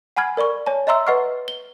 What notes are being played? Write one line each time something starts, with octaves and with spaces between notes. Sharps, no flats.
F#5 G#5 B5 F6 G#6
A#4 D5 B5 C#6
C#5 G#5 A5
D#5 E5 A#5 C6 E6
B4 D#5 F#5 C#6 F6
G7